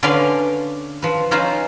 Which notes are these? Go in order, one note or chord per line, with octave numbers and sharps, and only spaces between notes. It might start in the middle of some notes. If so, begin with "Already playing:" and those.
D3 C#4 B4 D5 F5 C6
F3 B4
C#4 D#4 F4 G#4 B4 C5